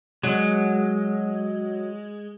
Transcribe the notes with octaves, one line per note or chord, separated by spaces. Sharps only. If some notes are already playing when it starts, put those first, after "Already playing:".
F#3 G#3